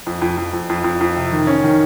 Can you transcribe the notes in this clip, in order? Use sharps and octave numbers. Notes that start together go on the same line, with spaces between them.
F2
F2
F2
F2
F2
F2
F2
C3
D#3
C#4
D#3